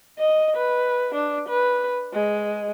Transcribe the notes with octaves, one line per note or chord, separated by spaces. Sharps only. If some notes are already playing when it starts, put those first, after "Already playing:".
D#5
B4
D4
B4
G#3